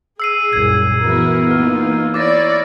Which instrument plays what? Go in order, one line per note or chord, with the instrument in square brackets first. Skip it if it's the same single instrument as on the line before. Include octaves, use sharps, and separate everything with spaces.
[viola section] G#4 [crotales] E6 C7 D#7
[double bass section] C2 F#2 A#2 [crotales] G#6
[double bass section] E3 B3 [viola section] E4 F#4 A#4
[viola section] A#3 D#4 F4 [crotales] F6
[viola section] E4 C#5 D5 [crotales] D6 A6 A#6